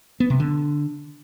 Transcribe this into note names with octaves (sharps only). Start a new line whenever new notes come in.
B3
C3
D3